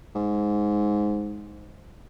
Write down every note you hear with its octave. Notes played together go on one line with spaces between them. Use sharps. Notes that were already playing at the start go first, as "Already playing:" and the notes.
G#2